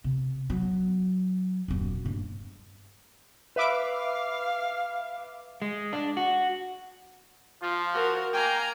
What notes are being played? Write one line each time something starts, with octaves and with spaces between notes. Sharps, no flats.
C3
F#3
D#1 F#2
G2 A#3
B4 E5 F5 D6
G#3
D4
F#4
F3 F4
F#4 A#4
A#3 G5 G#5 A#5